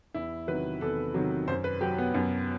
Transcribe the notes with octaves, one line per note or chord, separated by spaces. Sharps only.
E2 E4
C3 D#3 F#3 B4
E2 A4
C3 D#3 F#3
F#2 C5
B4
F#3 G4
B3
F#2